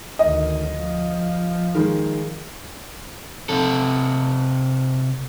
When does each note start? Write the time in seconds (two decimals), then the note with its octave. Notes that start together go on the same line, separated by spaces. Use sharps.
0.19 D2 D#3 D#5
0.73 F3
1.75 D#3 G#3
3.49 C3 A4